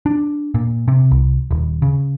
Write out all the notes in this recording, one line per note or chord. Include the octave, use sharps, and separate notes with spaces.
D4
A#2
C3
C2
D#1
C#3